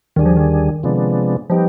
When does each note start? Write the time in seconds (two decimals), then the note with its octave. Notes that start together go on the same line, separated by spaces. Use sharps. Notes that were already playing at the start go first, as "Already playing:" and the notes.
0.16 D#2 D3 D#3 G3 D4 G#4
0.26 F3
0.37 D#3
0.83 C3 F3 G#3 B3 D4
1.50 F3 G3 B3 D#4 G4